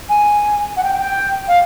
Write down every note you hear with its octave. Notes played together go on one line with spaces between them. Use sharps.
G#5
F#5
G5
G5
F5